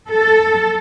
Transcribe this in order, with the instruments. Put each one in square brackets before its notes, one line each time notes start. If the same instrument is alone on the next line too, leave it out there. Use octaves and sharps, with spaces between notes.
[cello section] A4